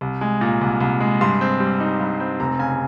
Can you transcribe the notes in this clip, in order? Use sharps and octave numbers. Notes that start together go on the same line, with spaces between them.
C2
G#3
A#2
C2
C2
G#3
G2 C6
C4
G3
D#4
G2
C4
F1 A#5
C#3 G#5